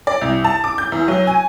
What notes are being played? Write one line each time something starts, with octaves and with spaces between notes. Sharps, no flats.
D5
C2
A5
D6
G6
E2
F#3
G#5